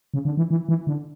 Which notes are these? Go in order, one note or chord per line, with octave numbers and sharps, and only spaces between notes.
C#3
D3
E3
E3
E3
D3